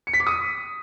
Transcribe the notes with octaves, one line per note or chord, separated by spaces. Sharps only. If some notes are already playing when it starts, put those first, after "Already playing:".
C#7
B6
D6
D#6